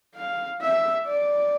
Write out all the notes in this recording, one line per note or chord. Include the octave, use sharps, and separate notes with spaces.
F5
E5
D5